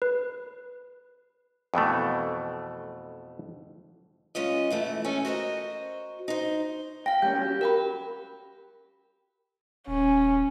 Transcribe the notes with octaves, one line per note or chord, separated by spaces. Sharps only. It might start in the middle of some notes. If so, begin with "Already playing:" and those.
B4
F2 B2 E3 A3
C#3 G#3 C#4 F4 D#5
F#2 E3 A3
C#4 A4 G#5
F#4 A#4 C5 D#5
D#4 C5
F5 G5 A#6
G3 A#3 C#4 G6
F#3 C#4 G5
F#4 G4
A#4 G5 B5
D#1 C#4